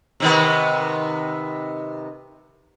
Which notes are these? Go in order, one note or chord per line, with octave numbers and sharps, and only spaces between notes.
C3 D#3 B3